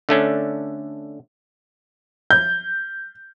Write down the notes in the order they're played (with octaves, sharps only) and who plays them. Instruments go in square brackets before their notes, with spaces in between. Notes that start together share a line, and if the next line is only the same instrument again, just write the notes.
[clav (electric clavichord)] D3 A3 C#4 D4
[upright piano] G6